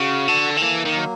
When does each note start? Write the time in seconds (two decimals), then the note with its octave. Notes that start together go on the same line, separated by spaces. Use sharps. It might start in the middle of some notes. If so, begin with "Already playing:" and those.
Already playing: C#3 F#4
0.28 D3 A4
0.57 D#3
0.62 E3 A#3
0.86 D#3
0.96 F#3